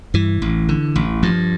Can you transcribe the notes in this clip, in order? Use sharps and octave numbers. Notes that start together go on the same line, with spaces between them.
G2 E3
A1
D3
A1
G2 F3